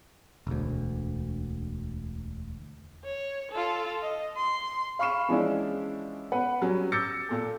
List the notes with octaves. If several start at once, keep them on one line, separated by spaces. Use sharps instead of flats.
E1 D2
C#5
F4 A4
D#5
C6
F5 B5 C#6 F6 C7 E7
E3 F3 G#3 C#4 D4 E4
B3 B4 F#5
F#3 G3 C#4
D6 E6 G6 A6 A#6 C#7
A#2 A4